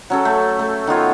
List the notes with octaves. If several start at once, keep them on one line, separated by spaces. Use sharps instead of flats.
F#3 C#4 A4
A3
A3
D#3 B3 F4 C#5